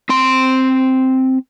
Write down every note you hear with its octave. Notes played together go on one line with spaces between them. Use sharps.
C4 C6